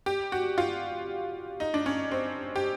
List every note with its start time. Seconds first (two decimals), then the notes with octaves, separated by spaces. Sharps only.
0.06 G4
0.32 F#4
0.58 F4
1.60 D#4
1.74 D4
1.86 C#4
2.11 C4
2.56 G4